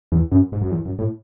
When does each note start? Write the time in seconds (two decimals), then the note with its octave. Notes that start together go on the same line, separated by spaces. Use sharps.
0.12 E2
0.32 F#2
0.52 G#2
0.61 F#2
0.71 E2
0.85 F#2
0.99 A2